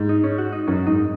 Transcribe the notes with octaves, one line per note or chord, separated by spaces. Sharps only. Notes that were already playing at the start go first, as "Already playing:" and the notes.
Already playing: G#2
D#4
C#4
F#4
D#4
F#2 C#4
G#2 D#4